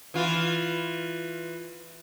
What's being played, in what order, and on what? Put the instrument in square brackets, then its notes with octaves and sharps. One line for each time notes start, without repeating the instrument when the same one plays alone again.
[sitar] E3 F4